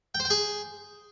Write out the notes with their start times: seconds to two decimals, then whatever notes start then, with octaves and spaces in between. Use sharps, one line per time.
0.15 G5
0.20 C5
0.25 G5
0.30 G#4